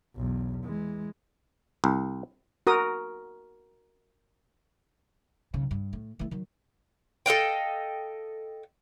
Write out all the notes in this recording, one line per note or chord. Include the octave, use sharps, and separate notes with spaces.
B1 E2
E3 G#3
C2
F#4 A#4 D#6
B1 C#3
G2
A2
E3 A3
D#3 F#3
A4 D#5 F5 G5